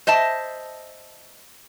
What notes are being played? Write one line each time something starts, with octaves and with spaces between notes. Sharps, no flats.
C5 D#5 E5 A5